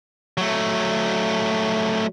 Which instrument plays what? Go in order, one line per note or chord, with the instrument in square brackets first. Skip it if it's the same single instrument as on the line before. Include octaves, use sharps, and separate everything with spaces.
[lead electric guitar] F#3 A3